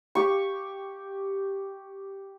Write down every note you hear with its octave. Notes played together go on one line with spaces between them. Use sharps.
G4 C#6